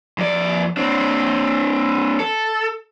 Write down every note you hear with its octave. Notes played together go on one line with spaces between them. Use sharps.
F2 D5
C4 D4
A4